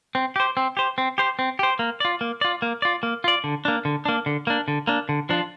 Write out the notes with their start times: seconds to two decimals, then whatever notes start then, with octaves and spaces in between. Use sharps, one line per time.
0.15 C4
0.36 G4 C5
0.57 C4
0.77 G4 C5
0.98 C4
1.18 G4 C5
1.39 C4
1.59 G4 C5
1.79 A#3
2.00 F4 D5
2.21 A#3
2.41 F4 D5
2.62 A#3
2.82 F4 D5
3.03 A#3
3.24 F4 D5
3.44 D3
3.65 A#3 D4
3.85 D3
4.05 A#3 D4
4.26 D3
4.47 A#3 D4
4.68 D3
4.87 A#3 D4
5.09 D3
5.29 F3 D4 F4